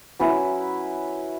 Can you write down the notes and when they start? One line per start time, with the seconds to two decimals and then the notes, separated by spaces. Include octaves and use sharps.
0.20 F#3 C#4 E4 B4